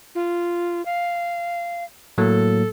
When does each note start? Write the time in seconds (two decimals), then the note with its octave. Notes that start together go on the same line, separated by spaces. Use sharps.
0.15 F4
0.86 F5
2.18 A2 F#3 A#3 A4